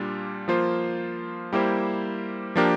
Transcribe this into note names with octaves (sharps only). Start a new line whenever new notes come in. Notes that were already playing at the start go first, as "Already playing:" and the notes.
Already playing: A#2 G3 D4 F4
F3 A#3 F4 C5
G3 A#3 E4 G4 C5
F3 A#3 D4 G4 A#4